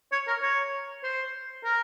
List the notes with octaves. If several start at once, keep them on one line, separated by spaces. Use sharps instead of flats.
C#5
A#4
C#5
C5
A#4